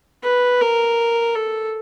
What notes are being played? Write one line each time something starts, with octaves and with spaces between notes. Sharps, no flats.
B4
A#4
A4